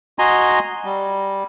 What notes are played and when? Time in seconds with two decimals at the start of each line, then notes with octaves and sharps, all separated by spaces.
0.19 F#4 D#5 G#5 A#5 C6
0.85 G3